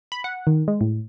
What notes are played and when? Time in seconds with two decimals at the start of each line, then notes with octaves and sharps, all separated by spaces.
0.12 B5
0.24 F#5
0.47 D#3
0.68 G#3
0.81 A2